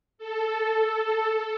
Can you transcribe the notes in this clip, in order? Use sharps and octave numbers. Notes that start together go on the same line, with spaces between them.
A4